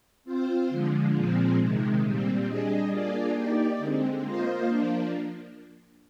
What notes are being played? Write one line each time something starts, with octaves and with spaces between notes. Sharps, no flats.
C4 F4 C5
D3 F3 G#3
A#2 F3 G#3 C4
C3 D#3 G#3
A#2 G3 C4
G3 D4 G#4 D#5
A#3 D4 F4 G#4 D5
A#3 D#4 G4 D5
D3 G#3 C4
A#3 F4 C5 D#5
F3 A#3 D4